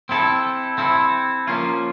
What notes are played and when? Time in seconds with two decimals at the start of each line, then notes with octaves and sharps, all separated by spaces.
0.09 C4 E4 A4
0.78 C4 E4 A4
1.47 F3 A#3 C#4 F4